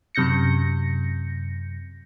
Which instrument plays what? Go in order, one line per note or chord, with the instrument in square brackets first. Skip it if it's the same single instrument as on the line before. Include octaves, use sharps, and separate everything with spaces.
[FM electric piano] F#2 C3 G6 A#6 C#7